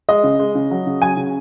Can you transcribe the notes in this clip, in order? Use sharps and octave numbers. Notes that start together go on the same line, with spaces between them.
G#3 D#5
C#3
G#3
C#3
F#3
C#3
F#3 G#5
C#3